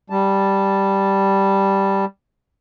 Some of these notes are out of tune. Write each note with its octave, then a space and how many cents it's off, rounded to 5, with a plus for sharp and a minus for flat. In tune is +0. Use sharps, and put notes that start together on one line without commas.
G3 +0 A5 +0